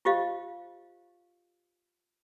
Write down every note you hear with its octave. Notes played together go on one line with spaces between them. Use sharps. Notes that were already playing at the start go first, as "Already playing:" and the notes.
F4 G4 C5 D#5 F5